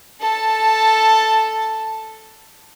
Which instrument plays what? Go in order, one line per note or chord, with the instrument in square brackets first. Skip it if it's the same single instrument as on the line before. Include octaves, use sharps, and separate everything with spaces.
[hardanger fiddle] A4 A5